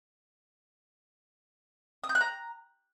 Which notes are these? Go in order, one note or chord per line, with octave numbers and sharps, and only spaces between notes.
D#6
G6
F#6
A#5